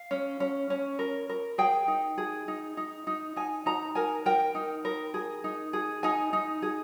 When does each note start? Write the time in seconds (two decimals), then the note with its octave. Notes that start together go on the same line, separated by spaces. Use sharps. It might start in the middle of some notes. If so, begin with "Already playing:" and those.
Already playing: F5
0.11 C#4
0.40 C#4
0.70 C#4
0.99 A#4
1.29 A#4
1.58 G#4 G5
1.88 D#4
2.18 G#4
2.48 D#4
2.77 D#4
3.07 D#4
3.36 D#4 G#5
3.66 D#4 A#5
3.95 A#4 G#5
4.26 A#4 G5
4.55 D#4
4.85 A#4
5.14 G#4
5.44 D#4
5.73 G#4
6.03 D#4 G#5
6.33 D#4
6.62 G#4